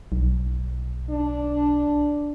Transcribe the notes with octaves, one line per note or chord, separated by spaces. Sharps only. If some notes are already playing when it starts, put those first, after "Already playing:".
B1
D4